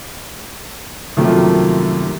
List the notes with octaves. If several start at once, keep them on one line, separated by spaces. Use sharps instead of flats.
F#2 C3 D#3 F3 A3 A#3